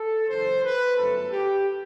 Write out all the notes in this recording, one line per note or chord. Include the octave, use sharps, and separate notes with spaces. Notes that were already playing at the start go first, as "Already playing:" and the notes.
Already playing: A4
F#1 F#2 E3 C5
B4
G1 F#2 F#3 A3 A4
G4